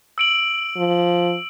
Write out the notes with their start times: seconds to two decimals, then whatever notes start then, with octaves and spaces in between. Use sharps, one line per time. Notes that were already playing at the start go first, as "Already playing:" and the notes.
0.18 E6 D7 F#7
0.77 F3